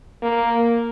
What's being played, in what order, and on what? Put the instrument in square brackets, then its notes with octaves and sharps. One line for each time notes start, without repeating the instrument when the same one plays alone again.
[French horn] A#3